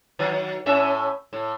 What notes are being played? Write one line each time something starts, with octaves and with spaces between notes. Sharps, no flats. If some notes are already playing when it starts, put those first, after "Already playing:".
D#3 F#3
A2 C#4 E5
A2